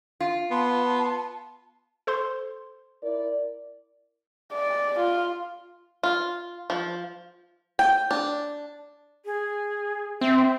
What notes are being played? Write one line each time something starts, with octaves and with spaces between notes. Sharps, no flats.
F4
B3 A5 C6
A4 C5 C6
E4 A#4 D5
D5
F4
F4
F3
G5
D4
G#4
C4 E5